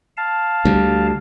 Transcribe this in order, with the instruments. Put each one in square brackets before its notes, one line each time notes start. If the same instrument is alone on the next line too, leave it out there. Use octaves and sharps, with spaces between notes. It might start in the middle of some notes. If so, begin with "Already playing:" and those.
[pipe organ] F5 A5
[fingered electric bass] D2 G3